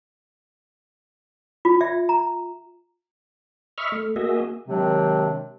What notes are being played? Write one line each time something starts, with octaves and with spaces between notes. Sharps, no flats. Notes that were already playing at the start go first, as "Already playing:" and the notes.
F4
E5
A#5
D#5 E5 B5 C#6 F6
A3
A#3 F#4 G#4 D#5 E5
C3 D#3 F#3 G#3 C4 D4